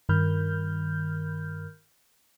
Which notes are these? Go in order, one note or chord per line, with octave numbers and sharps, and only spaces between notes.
G2 D#3 A#4 B5 F6 G6